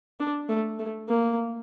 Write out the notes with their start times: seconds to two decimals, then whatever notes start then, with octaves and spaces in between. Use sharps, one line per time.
0.20 D4
0.49 A3
0.79 A3
1.09 A#3